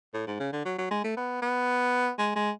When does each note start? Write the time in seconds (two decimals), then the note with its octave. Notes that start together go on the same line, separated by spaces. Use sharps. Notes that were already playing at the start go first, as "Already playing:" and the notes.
0.14 A2
0.27 G#2
0.40 C#3
0.53 D3
0.65 F#3
0.78 F#3
0.91 G#3
1.04 A3
1.17 B3
1.42 B3
2.18 G#3
2.36 G#3